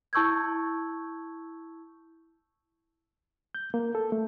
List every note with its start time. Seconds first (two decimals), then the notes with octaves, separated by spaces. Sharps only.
0.13 E4 A5 C#6 E6 G6 G#6
3.55 G6
3.74 A#3
3.95 A4
4.12 A3